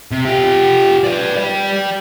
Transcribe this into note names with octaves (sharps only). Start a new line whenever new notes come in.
C3
F4 G4
B4 D5
G4 D5